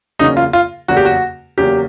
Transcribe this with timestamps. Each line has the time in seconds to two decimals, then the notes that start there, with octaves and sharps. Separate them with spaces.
0.19 E2 C#3 F#3 A#3 C#4 D#4
0.37 F4
0.53 F4
0.88 E2 C#3 F#3 A#3 C#4 F#4
0.97 G4
1.05 F#4
1.58 E2 C#3 F#3 A#3 C#4 G4